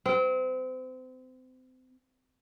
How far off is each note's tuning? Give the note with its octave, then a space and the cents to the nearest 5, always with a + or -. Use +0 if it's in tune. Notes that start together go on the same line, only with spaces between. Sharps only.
C4 -30